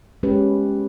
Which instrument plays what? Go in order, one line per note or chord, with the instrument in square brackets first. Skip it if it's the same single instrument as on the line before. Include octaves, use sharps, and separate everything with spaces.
[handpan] G#3 C#4 G4 B4